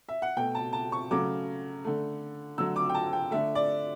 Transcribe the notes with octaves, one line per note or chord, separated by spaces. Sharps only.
E5
F#5
B2 A3 G5
A5
A5
C#6
C#3 F#3 A3 D6
D3 A3
D3 F#3 A3 E6
D6
G5
A5
G5
D3 A3 E5
D5